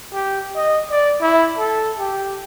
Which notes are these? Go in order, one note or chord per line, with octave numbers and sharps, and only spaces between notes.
G4
D#5
D5
E4
A4
G4